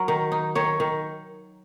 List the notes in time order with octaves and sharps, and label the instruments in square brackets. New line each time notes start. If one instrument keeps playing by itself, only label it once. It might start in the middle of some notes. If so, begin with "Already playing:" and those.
Already playing: [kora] F#3 A#4
D#3
D#4
D#3 C#5
D#3